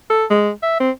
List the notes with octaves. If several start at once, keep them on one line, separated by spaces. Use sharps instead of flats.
A4
G#3
E5
C4